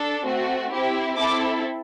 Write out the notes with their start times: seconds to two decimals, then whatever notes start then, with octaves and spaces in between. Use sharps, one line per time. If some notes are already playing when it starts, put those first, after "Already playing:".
Already playing: D4 A4
0.25 A3 C4 F#4
0.72 C4 E4 G4
1.18 C4 E4 A4 D6